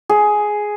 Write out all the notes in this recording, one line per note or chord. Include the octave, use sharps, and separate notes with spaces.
G#4